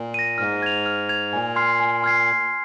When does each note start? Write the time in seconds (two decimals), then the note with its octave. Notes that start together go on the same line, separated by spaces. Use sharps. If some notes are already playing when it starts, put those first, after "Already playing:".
Already playing: A#2
0.14 A#6 D#7
0.38 G#2 F6
0.63 G#6 F7
0.86 F6
1.09 G#6 F7
1.33 A#2 G#5
1.56 C6 F6 G#6 C7
1.80 G#5
2.02 C6 F6 G#6 C7